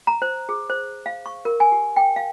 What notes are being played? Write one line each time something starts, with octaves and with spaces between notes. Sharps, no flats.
A#5
C5
G#4
C5
F5
C#6
A#4
G#5
G4
G5
F5